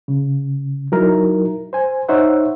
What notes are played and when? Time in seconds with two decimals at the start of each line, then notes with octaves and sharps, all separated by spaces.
0.08 C#3
0.92 F#3 D#4 E4 A#4
1.73 C5 G#5
2.09 D#4 C5 C#5 E5 F#5